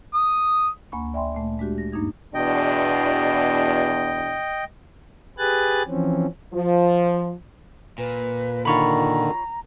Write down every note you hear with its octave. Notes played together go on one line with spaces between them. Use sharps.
D#6
D2 A#3 G#5 B5 C#6
D5 E5 G5 G#5 B5 C6
A#2 A3
G#3 D4 F#4 G4
A#6
G2 A#3 D4 D#4 G#6
E2 B2 D4 D#5 G5
G4 G#4 B4 G#5 F#6 A6
E3 F3 C4 C#4
F3
A#2 B4
D3 D#3 F4 C#5 A#5 B5